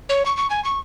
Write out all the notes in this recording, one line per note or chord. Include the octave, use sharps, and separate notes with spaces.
C#5
C#6
C#6
G#5
C#6